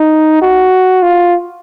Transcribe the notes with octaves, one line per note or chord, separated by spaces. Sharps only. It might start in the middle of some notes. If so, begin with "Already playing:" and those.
Already playing: D#4
F#4
F4